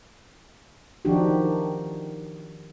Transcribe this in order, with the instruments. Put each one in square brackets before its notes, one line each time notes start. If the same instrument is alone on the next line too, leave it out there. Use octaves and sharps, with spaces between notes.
[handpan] D#3 F3 D4 D#4 F#4 G4